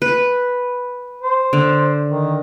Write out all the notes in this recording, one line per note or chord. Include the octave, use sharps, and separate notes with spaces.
B4
C5
D3
D#3